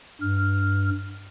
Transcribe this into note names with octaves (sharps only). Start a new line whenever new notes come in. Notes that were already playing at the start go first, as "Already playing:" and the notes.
G2 F6